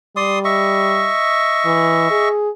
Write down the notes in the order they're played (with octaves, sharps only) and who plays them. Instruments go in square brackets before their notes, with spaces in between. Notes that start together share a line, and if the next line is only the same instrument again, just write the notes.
[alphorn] G3 [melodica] D5 C6 D#6
[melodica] D#5 E5 C#6
[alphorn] E3
G#4